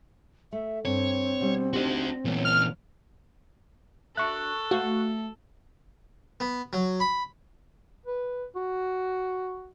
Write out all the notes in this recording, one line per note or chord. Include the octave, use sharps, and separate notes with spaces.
A3 E5
G2 C4 C#5
B2 G3
D4 D#4 F#4 G4 C5
A#2 E3 B3 C#4
F6
D4 F#4 A4 E5 C#6 F#6
A3 F#4 C5 F5
B3
F#3
B5
B4
F#4